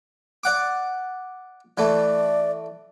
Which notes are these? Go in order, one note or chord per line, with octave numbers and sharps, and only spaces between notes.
D5 F#5 D6
E3 A3 D5